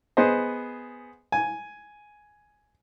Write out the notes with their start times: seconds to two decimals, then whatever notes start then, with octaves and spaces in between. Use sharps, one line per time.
0.17 B3 G#4 C5 D#5
1.32 G#5